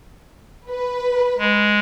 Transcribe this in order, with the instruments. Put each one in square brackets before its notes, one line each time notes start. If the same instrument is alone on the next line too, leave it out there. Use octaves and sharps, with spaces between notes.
[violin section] B4
[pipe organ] G#3